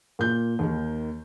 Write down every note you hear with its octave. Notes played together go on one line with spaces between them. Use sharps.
A#2 G6
D#2 D#3